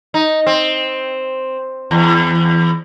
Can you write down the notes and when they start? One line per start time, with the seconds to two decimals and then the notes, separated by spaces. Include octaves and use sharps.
0.14 D#4
0.46 C4
1.91 E2